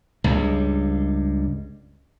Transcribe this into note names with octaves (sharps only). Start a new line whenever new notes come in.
C#2 G2